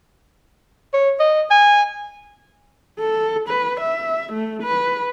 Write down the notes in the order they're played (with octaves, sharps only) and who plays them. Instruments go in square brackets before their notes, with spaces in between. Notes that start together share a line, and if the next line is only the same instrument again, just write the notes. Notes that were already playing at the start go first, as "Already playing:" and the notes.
[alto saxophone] C#5
D#5
G#5
[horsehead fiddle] A4
B4
E5
A3
B4